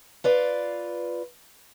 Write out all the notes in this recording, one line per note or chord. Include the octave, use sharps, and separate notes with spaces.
F4 B4 D5